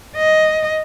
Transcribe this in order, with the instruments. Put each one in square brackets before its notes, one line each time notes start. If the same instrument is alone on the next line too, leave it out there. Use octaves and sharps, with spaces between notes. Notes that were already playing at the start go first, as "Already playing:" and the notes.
[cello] D#5